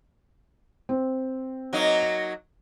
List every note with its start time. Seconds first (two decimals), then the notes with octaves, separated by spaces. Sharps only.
0.89 C4
1.73 F#3 A#3 D#4